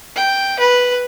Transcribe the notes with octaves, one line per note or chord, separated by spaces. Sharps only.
G5
B4